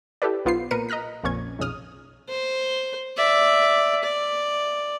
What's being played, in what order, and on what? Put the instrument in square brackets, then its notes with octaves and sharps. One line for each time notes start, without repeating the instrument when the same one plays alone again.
[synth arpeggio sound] E4 G4 A4 B4 D5
B1 B3 F4 C5 C7
A#2 A#4 B4 C#7 D#7
D#5 A#5 F6 F#6 B6
A#1 F2 A#2 C#4 C#6 G#6
B1 F2 C#3 D#6 F6
[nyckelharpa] C5
D5 E5
D5